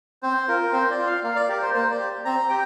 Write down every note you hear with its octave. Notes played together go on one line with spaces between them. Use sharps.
C4 C5
F4 A#4
C4 C5
D5
F4
F5
A#3 F5
D5
G4 A#4
C5
A#3 C5
D5
G4
C4 A#5
G4 G5